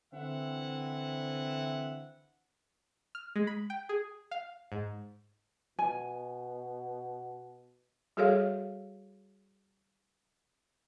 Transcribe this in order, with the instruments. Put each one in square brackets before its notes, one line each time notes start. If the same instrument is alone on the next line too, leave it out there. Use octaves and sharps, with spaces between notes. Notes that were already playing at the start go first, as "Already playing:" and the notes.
[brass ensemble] D3 E3 C4 E5 F#5
[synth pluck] F6
G#3
B5
G5
G#4
F5
G#2
[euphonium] B2 [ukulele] G#5
[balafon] G3 F#4 G#4 A4 C#5 F5